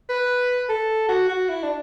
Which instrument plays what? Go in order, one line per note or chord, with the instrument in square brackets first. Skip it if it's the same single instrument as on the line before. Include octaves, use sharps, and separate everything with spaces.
[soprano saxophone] B4
A4
F#4
F#4
E4
D4